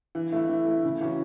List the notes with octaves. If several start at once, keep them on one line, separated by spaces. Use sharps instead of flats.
E3
A3 E4
E3
A3 E4
C#3
E3 C#4 F#4